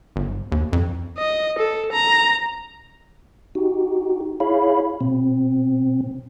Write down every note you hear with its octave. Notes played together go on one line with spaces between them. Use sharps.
G1
D#2
F2
D#5
A4
A#5
D#4 F#4 G4
E4 G#4 C#5 F5 B5
B2 C4